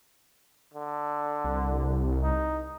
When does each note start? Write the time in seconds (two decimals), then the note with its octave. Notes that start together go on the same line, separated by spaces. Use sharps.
0.74 D3
1.45 C2
2.23 D#4